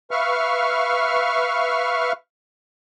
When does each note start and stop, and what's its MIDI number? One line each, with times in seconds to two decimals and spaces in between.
0.11 2.12 71
0.11 2.12 76
0.11 2.12 77
0.11 2.12 85
0.11 2.12 89